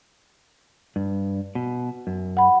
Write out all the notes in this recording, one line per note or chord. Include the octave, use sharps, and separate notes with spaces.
G2
B2
F#2
F#5 B5